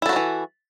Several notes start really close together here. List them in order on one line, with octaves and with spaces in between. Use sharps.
E4 A4 F#4 F#3 E3